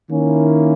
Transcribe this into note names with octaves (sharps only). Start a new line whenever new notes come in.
D#3 A#3 C#4 E4